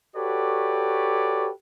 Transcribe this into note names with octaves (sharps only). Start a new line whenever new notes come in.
F#4 G4 A4 B4 C#5 D5